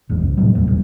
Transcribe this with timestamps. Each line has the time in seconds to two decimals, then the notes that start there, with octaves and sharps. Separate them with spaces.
0.09 F#1 E2 G#2
0.22 C#2
0.37 A2 C3 F#3 G3
0.55 E1 D#2 F#3 A3
0.67 F#1 E2 G#2 G3